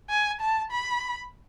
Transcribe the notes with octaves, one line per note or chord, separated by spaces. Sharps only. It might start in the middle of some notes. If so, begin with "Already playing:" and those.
G#5
A5
B5